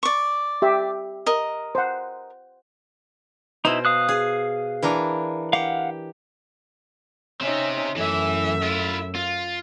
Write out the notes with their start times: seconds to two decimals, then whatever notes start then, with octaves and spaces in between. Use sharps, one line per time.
0.03 D5 C#6
0.62 G4 E5
1.26 A#4 D#5
1.75 C5 F#5
3.65 B2 D#4 E4 C5
3.85 F5 D#6 F#6
4.09 G#4
4.83 E3 D4 A#4
5.53 G4 F5 F#5
7.41 C4 C#4 D#4 E5
7.96 F#2 E3 A3 E5
8.63 E4 F4
9.16 F4